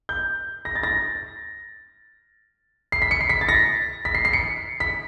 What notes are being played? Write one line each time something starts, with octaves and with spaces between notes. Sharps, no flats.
G6
A#6
A6
A#6
C7
B6
C#7
C7
B6
A6
A#6
B6
C7
C7
C#7
B6